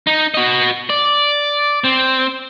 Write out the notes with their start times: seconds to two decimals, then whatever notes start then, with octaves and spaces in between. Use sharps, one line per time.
0.07 D#4
0.34 F#4 D#5
0.90 D5
1.84 C4